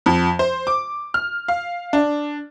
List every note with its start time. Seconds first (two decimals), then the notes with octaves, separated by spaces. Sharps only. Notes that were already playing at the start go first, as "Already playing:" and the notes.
0.06 F2
0.39 C5
0.67 D6
1.14 F6
1.48 F5
1.93 D4